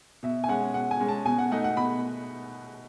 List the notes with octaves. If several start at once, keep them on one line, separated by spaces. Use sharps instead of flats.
B2 E5
G#5
G#3 C#4 F#5
B2 F#5
G#5
G#3 C#4
A5
B2 G#5
F#5
A3 D#4 F#5
F#5
B2 B5